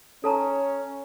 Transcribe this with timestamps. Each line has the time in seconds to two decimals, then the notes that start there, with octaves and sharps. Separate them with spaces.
0.24 C#4 A4 A5 A#5